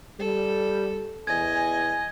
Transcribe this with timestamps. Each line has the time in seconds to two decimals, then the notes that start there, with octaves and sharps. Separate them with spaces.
0.19 G3 A4
1.27 E2 D#5 G#5 G#6